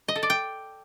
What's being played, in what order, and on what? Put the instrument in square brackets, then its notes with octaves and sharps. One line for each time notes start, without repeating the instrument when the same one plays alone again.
[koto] D#5
A4
D5
G5